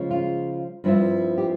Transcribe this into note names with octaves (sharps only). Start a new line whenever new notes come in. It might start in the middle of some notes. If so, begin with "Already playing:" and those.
Already playing: C#3 F3 G#3
F4
G2 F3 C4 E4
G4